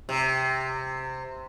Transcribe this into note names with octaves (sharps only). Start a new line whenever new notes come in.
C3